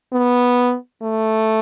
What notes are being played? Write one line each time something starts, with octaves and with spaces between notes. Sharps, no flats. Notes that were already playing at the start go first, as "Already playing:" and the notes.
B3
A3